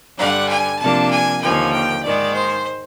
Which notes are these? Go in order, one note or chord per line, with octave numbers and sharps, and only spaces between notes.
G2 D3 G3 F#5
G#5
C3 F3 A#3 D4 A5
G#5
D#2 D3 F3 A#3 G#5
G5
G#2 D#3 G#3 D5
C5